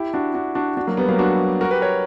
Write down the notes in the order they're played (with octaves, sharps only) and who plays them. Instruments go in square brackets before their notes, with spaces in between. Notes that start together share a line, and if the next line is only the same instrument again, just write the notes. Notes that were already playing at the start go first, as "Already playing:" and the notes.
Already playing: [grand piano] E4 G4
D4 F#4
D4 F#4
D4 F#4
D4 F#4
F#3 A#3
G3 B3
F#3 A#3
D4 F#4
F#4 A#4
G4 B4
A#4 C#5